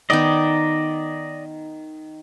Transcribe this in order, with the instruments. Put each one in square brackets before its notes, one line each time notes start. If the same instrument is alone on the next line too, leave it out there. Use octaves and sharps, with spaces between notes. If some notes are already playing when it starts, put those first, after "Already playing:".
[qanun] D#3 B3 D#4 [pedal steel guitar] D5 D#5